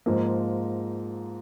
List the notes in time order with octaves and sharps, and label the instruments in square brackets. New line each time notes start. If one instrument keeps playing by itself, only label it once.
[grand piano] G#2 F3 A#3